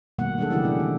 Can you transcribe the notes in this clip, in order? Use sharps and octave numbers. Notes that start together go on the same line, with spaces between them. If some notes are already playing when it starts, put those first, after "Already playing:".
B2 D#3 G3 A3 A#3 F#5
D#3 F#3 G#3 D4 G#4 A4
C#3 E3 C#4 E4 G4 F#5
B2 D4
D#3